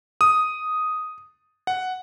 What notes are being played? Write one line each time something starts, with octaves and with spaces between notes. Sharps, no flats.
D#6
F#5